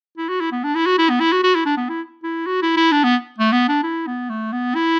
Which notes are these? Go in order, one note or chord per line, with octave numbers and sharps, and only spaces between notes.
E4
F#4
E4
B3
D4
E4
F#4
E4
B3
E4
F#4
F#4
E4
D4
B3
E4
E4
F#4
E4
E4
D4
B3
A3
B3
D4
E4
B3
A3
B3
E4